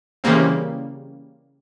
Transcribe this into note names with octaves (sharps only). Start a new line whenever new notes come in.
C#3 E3 G3 A#3 C4